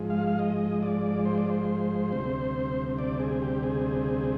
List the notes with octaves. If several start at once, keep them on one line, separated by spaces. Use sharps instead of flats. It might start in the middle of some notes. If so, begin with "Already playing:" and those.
Already playing: G#2 F3 G#3
F5
F5
D#5
D5
C5
D5
C5
D2 C3 G3 C4
D5
G#4
G4
G#4